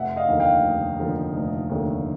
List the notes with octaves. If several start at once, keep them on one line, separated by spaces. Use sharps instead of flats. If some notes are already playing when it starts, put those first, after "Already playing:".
Already playing: F1 E5 F#5
D#5 F5
D#2 D3 F3 A3
F5 G5
F1
D#2 D3 F3 A3
F1
D#2 D3 F3 A3